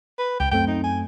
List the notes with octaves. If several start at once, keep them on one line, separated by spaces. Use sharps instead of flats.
B4
C#2 G5
F#2 A3 C4 G5
D#4
G#5